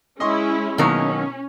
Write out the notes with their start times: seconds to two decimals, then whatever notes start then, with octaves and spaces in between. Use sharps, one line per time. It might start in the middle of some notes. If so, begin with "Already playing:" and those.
0.20 G#3 C#4 E4 D#5 C6 C#6
0.78 B2 D#3 F#3 A#3 C#4 C#5